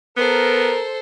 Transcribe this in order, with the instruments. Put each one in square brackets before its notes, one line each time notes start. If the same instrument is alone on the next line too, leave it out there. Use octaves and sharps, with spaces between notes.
[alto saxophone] B3 [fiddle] A4 C5 [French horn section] A#4